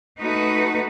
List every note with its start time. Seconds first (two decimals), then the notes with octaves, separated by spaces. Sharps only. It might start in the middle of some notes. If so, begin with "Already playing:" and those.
0.20 A3 D#4 F#4 B4